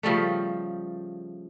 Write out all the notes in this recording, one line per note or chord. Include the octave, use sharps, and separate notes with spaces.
C#3 F3 G3 A3